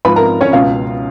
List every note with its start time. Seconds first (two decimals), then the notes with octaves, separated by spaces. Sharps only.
0.05 G#2 F3 B4 B5
0.16 A#4 A#5
0.41 C#4 C#5
0.53 C#2 B2 F4 F5